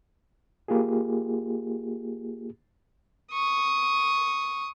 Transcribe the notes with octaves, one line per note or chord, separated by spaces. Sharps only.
A#3 F4 G4 G#4
C#6 D#6